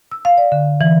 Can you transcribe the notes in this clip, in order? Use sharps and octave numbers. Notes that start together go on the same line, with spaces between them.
E6
F5
D5
D3
E3